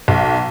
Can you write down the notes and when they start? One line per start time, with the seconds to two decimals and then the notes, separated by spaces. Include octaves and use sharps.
0.08 B1